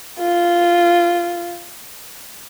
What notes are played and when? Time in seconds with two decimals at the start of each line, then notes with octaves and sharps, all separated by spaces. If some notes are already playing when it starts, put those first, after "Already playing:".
0.20 F4